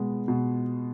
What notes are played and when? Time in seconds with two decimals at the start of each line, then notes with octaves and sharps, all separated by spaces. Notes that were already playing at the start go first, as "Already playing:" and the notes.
Already playing: B2 G#3 B3
0.28 B2